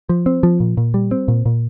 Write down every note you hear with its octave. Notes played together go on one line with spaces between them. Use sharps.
F3
C4
F3
A#2
A#2
G3
C4
A#2
A#2